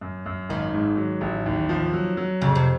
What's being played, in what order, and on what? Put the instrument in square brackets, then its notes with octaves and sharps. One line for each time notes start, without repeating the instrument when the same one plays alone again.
[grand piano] F#2
F#2
[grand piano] G#1 [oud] D#3
[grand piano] G#2
F#3
A1
D#2
F3
F#3
F#3
[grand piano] F2 [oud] C#3
[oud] C3